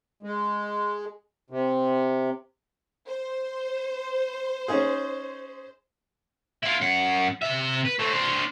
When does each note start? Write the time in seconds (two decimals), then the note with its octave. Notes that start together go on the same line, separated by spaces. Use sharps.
0.23 G#3
1.50 C3
3.06 C5
4.68 C#4 D#4 G#4
6.63 E4 F4
6.81 F#2 F#5
7.42 C3 E5
7.85 B4
7.99 A3 C4
8.12 D4 C5